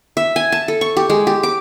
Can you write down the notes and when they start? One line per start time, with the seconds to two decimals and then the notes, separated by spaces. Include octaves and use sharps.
0.17 E5
0.36 G#5
0.52 A5
0.68 A4
0.81 C#6
0.97 G4
1.10 G#3
1.27 G4
1.43 D6